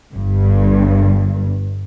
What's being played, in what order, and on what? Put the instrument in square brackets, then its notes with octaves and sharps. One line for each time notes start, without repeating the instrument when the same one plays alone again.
[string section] G1 G2